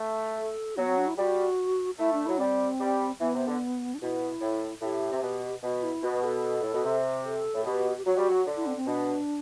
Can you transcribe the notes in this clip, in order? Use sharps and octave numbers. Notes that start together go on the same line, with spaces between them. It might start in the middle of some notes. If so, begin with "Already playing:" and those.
Already playing: A3
A4
F#3 B3
C4
D4
E4
G3 F#4
A3 E4
D4
F#3 E4
G3 C4
G3
E3 B3
C3
D3
D4
B2 E4
A2
A2 G4
C3
B2
B2 F#4
E4
B2 F#4
A4
A2
B2
C3
A4
A2
B2 G4
G4
F#3 F#4
G3
F#3
D3
E4
C4
C4
B2 D4